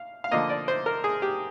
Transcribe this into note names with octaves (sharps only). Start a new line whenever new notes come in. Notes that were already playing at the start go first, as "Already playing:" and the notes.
Already playing: F5
F5
D3 F3 A#3 D#5
D5
C5
A#4
G#4
G4